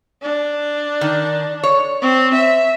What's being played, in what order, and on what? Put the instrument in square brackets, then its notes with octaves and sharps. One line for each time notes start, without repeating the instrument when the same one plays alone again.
[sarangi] D4
[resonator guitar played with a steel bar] D#3
C#5
[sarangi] C4
E5